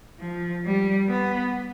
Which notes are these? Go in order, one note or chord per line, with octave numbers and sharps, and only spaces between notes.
F3
G3
B3